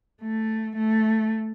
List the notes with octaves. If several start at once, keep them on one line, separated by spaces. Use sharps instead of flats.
A3
A3